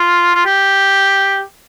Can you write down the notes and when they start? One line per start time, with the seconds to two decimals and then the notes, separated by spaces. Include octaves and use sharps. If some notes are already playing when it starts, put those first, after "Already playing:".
Already playing: F4
0.35 F4
0.45 G4